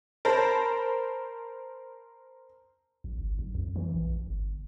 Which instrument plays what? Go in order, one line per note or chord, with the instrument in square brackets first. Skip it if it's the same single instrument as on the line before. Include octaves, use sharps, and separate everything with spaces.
[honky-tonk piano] A#4 C5 A5 B5
[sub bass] A#1
G1
B1
F2
E3
A#1
G1